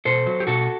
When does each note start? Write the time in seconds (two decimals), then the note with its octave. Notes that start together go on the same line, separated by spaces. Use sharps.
0.05 B2 A4 C5
0.26 F#3
0.40 G4
0.47 B2 F#4 A4